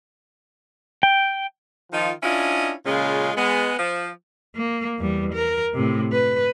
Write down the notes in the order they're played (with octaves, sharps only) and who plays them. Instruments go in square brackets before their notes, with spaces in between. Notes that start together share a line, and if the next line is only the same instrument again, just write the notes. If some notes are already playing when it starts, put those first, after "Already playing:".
[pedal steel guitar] G5
[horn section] D#3 F3 D#4 F4
C#4 D4 E4 F4 D#5
A#2 C#3 G#3 C#4 F4
G#3 B3
F3
[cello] A#3
E2 G3
A#4
A2 C3
B4